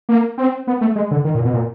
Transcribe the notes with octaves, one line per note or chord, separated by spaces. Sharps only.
A#3
C4
B3
A3
G#3
D3
D#3
A#2
B2
A#2